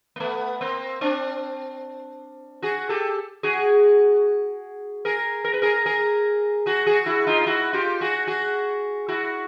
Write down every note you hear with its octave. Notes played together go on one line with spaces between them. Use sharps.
A#3
A3 B3
A#3 C4
C4 D4
F#4 G#4
G4 A4
F#4 G#4
G#4 A#4
A#4
B4
G#4 A#4
G#4 A#4
F#4 G#4
F#4 G#4
E4 F#4
D#4 F4
E4 F#4
F4 G4
F#4 G#4
F#4 G#4
E4 F#4